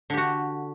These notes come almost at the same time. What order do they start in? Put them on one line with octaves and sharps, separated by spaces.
D3 G4 F#4